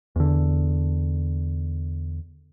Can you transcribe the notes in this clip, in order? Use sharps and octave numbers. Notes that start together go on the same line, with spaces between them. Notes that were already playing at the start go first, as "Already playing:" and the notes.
E2 D3